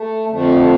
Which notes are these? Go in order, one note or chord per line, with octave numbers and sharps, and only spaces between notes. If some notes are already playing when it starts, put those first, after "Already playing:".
Already playing: A3
F2 D3 F3 A3